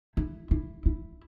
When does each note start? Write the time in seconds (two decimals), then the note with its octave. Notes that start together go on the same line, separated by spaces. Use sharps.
0.17 E4
0.51 E4
0.86 E4